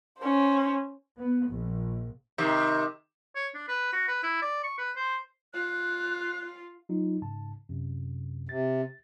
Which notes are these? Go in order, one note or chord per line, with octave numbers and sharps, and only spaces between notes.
C#4 C5
B3
A#1
C3 D#3
C#5
D4
B4
F#4
B4
E4
D5
C#6
B4
C5
F4 F#6
F#3 D#4 F4
G#2 C#3 A5
F#2 C3
C3 A6